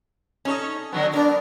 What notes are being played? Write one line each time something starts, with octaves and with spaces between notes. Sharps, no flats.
C#4 D#4 A4 C#5 D#5
D3 F#3 B3
B3 D4 A#4 D5